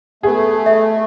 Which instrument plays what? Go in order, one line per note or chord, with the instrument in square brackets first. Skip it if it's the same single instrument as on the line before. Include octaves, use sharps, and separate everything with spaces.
[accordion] A3 [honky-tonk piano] B3 G#4
[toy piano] E5